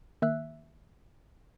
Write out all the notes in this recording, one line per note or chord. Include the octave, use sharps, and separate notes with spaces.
D#3 A#3 E5 E6 F#6